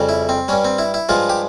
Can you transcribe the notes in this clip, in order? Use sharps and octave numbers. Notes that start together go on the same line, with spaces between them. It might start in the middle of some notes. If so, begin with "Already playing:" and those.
Already playing: F2 C#3 G3
E4
C4
G2 G3 C#4
C4
E4
E4
G2 F3 G#3 F4
G4